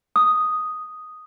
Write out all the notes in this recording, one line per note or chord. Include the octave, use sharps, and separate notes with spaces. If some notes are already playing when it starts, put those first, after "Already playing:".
D#6